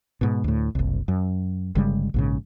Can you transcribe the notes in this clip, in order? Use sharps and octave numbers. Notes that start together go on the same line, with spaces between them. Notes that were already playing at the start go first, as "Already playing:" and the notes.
G#2 B2
D2 A2
F#1 C2
F#2
G1 C#3 G3 G#3
A#1 G#2 C#3